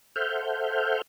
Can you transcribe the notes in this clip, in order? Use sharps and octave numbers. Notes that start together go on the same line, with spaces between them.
A4 C5 E5 F#5 F6 G6